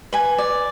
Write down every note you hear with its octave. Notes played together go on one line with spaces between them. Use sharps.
B4 G#5
D5